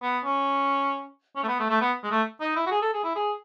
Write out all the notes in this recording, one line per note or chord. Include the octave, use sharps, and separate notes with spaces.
B3
C#4
C#4
A3
B3
A3
A3
B3
G#3
A3
D#4
E4
F#4
G#4
A4
G#4
E4
G#4